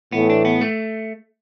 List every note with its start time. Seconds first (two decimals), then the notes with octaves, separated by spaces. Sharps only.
0.12 A2 E3 A3 B3
0.30 D4
0.45 B3
0.61 A3